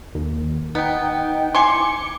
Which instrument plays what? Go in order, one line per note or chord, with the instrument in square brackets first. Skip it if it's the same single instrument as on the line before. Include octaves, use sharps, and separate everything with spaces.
[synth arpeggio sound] D#2
[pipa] B3 [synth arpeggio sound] D#4 G5
[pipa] E4 G#5 C6 [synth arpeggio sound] D6 C#7